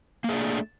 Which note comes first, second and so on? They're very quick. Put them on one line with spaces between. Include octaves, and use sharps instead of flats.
A#3 G#4 D4 A3